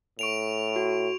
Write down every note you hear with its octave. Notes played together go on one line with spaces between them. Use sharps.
A2 C#6 D7 F7
F#4